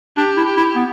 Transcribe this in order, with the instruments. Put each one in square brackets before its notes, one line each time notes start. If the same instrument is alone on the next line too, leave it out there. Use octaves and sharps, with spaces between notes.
[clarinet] D4 [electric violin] G4
[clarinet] E4
[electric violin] G4
[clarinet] E4
B3